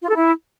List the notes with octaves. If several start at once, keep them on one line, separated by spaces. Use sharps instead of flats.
F4
A4
E4